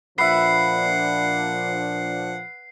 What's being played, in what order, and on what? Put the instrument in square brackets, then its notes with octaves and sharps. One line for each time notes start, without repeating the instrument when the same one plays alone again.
[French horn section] A#2 F3 D4 [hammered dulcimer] B4 E5 [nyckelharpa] F#5 [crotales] C7